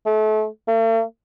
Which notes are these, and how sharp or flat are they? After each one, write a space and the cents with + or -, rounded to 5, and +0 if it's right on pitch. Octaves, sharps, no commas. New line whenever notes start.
A3 -30
A3 +45